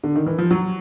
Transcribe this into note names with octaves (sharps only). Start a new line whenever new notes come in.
D3
D#3
E3
F3
F#3